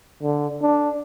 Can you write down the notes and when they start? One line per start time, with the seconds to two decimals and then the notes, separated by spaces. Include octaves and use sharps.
0.23 D3
0.62 D4